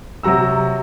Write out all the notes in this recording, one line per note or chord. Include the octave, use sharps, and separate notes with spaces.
C3 F#3 F#4 A#5 E6